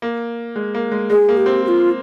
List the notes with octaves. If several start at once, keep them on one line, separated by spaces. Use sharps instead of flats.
A#3
G#3
A#3
G#3
G#3 G#4
A#3
G4
C4
G4
F4